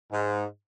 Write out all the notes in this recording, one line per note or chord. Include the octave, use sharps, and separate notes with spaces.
G#2